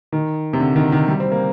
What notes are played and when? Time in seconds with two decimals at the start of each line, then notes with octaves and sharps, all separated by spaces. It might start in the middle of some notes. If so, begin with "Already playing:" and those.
0.12 D#3
0.53 C3
0.60 D3
0.76 D#3
0.92 D#3
1.08 G3
1.20 C4
1.32 A#3